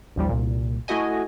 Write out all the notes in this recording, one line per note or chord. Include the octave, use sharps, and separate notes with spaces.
A1 D#2 F3 G3
C2 A#2
A3 E4 F#4 D#5 G#5